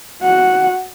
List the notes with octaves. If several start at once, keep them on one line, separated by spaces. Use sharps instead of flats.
F#4 F#5